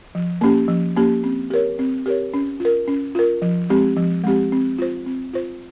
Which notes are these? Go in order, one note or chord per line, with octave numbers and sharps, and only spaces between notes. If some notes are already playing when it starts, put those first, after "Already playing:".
F3
A#3 C#4 G4
F3
A#3 C#4 G4
C4
G4 A#4 C#5
C4
G4 A#4 C#5
C#4
F4
A#4
C#4
F4 A#4
F3
G#3 C4 G4
F3
G#3 C4 G4
C4
F4 C5
C4
F4 C5